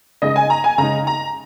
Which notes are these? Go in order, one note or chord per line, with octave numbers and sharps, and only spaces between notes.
C#3 G#3 D#4 D#5
G#5
A#5
G#5
C#3 G#3 D#4 A#5
A#5